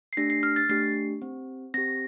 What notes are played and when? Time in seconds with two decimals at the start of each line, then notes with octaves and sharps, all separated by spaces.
0.13 C7
0.17 A3 D4 G4 A#6
0.30 C7
0.43 F6
0.56 A6
0.69 A3 D4 G4 C7
1.22 C4 G4
1.74 C4 G4 A#6